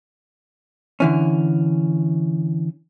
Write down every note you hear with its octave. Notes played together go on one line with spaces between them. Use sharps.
D3 E3 C#4